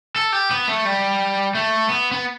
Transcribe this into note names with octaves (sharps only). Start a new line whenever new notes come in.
A4
G4
B3
A3
G3
A3
B3
B3